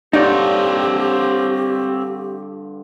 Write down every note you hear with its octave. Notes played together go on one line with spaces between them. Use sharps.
G2 D3 C4 D#4 F4 G4 C#5 D5